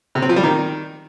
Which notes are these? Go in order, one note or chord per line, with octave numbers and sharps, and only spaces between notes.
C3
C4
F3
G3
D#3